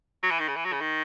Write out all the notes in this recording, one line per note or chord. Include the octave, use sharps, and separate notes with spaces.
F#3
E3
D#3
C#3
E3
F#3
C#3
D#3